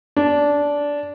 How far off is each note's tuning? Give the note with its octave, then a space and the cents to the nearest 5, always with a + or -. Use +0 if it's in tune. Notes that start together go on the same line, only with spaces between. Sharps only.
D4 -15